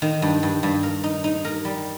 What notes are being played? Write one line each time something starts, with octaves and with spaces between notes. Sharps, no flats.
D#3
G2
G2
G2
A#4
D#4
D#4
A#4
G3